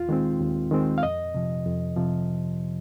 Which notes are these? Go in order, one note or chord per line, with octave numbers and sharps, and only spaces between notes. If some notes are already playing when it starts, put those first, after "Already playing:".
Already playing: D#2 F4
D#3 G#3 C4
D#2
D#3 G#3 C4
F5
F2 D#5
C3 F3
F2
C3 F3